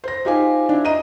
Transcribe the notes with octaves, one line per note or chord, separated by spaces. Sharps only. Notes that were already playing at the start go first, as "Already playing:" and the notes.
C5 A#6
D#4 F4 G4 C5 F5 G#5
D4 E4
D#5 A#5 D#7